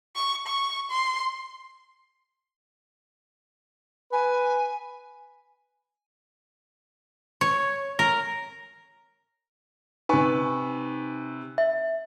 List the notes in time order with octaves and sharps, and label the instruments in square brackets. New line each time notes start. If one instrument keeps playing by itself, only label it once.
[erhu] C#6
C#6
C6
[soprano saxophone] B4 [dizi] G#5
[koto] C#5
A#4
[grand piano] C3 B4 [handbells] D#4 G#5 C#6
[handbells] E5